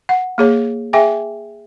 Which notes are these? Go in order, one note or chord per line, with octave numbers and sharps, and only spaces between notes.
F#5
A#3 G#4 C#5
G#4 E5 G5 G#5